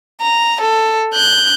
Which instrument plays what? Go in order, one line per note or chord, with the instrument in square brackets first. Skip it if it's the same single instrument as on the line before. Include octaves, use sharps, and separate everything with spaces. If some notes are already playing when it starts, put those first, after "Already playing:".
[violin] A#5
A4
F#6 G6